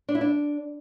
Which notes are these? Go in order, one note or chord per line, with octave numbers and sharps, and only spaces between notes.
D4
E4
D4